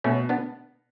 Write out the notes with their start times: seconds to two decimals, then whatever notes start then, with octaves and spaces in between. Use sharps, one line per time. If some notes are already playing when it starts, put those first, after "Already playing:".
0.04 B2 A3 C#4
0.29 B3 D4